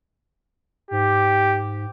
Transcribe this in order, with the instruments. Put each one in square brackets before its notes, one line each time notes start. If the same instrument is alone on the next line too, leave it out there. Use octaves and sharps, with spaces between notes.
[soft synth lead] G#2 [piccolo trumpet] G4